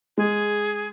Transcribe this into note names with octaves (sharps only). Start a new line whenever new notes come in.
G#3 G#4